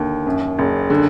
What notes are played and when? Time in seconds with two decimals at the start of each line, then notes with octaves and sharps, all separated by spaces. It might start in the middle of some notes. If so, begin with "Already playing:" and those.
Already playing: D#2 D3
0.26 F#2
0.59 F#1
0.90 D3